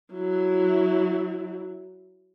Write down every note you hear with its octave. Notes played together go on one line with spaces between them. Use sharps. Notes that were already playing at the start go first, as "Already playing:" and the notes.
F#3 E4